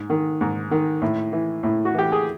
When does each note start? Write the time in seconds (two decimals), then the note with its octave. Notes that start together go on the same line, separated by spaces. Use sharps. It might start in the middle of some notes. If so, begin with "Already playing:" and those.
Already playing: G#2
0.10 D#3
0.41 G#2
0.71 D#3
1.02 A2
1.33 E3
1.63 A2
1.85 F#4
1.94 E3 G4
2.12 G#4